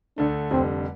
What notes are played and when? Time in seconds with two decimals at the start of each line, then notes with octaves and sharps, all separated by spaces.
0.18 D2 D3 A3 D4
0.51 F1 F2 D3 G3 C4